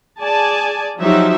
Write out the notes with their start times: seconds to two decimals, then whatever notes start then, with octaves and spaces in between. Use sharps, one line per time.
0.21 G#4 D5 G#5 A5
1.00 F3 F#3 D#4 F#4 G4 E5